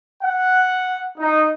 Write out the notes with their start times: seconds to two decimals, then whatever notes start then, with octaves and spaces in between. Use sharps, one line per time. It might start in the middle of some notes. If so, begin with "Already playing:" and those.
0.23 F#5
1.18 D#4